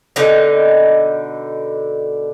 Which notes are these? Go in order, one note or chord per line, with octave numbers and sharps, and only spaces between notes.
B2 D3 D#4